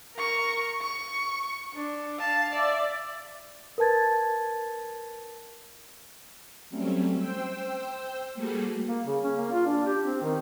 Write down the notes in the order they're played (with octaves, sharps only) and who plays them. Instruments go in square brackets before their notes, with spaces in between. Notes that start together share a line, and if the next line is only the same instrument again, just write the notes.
[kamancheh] A#4 C#6
C#6
D4
F5 A5
D5 E5
[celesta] A#4 B4 A5 G#6 A6
[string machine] F#3 G3 A3 C4 C#4
C5 G5 E6
G3 A3 A#3 F#4 G#4 A4
[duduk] A#3
C#3
C#4
A#3
F4
D4
G4
C4
D#3